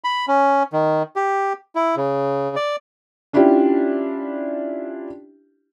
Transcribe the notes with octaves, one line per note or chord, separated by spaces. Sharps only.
B5
C#4
D#3
G4
E4
C#3
D5
C#4 D4 E4 F4 G4